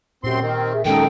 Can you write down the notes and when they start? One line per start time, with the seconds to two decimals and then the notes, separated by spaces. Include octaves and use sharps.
0.24 F#2 A#2 C4 G4 C6
0.41 D#3 C4
0.72 G#4 E5
0.85 F#2 D#3 G#3 C#4 D#4 A4 G5